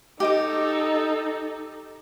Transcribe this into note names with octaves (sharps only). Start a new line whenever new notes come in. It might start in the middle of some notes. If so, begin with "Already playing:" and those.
D#4 G4 A4 D#5 D6